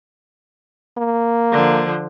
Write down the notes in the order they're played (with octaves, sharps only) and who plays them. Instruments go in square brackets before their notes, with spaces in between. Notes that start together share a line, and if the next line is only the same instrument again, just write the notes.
[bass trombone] A#3
[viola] D3 F3